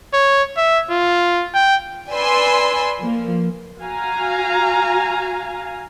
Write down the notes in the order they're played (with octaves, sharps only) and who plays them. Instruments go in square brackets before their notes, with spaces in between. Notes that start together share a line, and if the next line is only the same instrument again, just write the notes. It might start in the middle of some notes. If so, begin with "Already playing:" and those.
[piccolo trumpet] C#5
E5
F4
G5
[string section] B4 D5 G#5 B5 C6 E6
F3 A#3
[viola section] F#4 F5 G#5 A#5